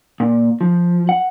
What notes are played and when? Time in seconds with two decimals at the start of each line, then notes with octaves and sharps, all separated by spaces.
0.20 A#2
0.61 F3
1.09 F#5